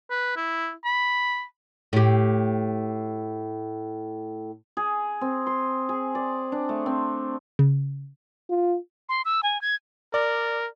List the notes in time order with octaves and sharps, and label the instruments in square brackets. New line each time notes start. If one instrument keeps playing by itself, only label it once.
[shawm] B4
E4
B5
[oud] A2 G4
[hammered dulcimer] G#4
C4
C6
G#4
D5
D4
A3
C4
[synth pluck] C#3
[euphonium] F4
[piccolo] C6
E6
G#5
G#6
[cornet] A#4 [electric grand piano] D5